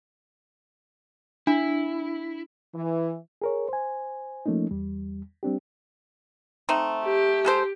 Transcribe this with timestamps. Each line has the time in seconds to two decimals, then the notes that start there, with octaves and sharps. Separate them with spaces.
1.47 D4 E4
2.74 E3
3.42 G#4 A#4 C#5
3.69 C5 G#5
4.46 F3 A3 A#3 C#4 D#4
4.71 E2 G3
5.43 G3 C4 D4 G4
6.69 A3 C4 D#4
7.04 G4
7.45 G#3 A4 C5